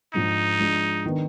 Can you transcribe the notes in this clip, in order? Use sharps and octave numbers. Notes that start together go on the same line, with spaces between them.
G#2 F3 G#3 D4 D#4
F3 G#3 D4
D#3 B3 D4